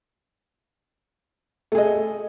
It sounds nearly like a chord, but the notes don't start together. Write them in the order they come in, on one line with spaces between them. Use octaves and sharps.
A3 G#4 D#5